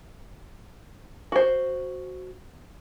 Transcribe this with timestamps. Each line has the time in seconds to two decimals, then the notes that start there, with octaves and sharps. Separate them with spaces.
1.32 F#4 C5